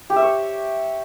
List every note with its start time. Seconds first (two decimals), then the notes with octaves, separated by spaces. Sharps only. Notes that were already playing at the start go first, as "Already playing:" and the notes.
0.10 G4
0.16 E5
0.22 C#5